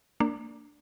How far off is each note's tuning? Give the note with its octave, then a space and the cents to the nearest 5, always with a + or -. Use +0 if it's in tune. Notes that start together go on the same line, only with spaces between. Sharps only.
A#3 -15 D4 +0